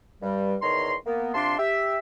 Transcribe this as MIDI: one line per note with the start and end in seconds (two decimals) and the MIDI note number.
0.22 0.56 43
0.22 0.56 55
0.62 0.95 40
0.62 0.95 51
0.62 0.95 73
0.62 0.95 82
0.62 0.95 84
1.06 1.33 58
1.06 1.33 59
1.34 1.57 48
1.34 1.57 62
1.34 1.57 65
1.34 1.57 81
1.34 1.57 84
1.59 1.98 67
1.59 1.98 76